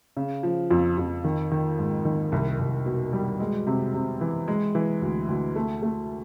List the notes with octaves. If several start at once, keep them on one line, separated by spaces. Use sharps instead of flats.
C#3
F3
F2
F2
D#3
D#3
G#2
D#3
C2
C2
B2
G3
G#3
C3
C3
E3
G#3
E3
D2
D2
A3
A3